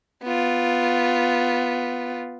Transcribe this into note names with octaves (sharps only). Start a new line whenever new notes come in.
B3 F4